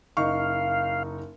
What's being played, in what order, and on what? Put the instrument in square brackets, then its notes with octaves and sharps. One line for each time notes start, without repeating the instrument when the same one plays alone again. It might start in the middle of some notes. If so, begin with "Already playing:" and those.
[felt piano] F#1 D#4 C#6 [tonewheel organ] F5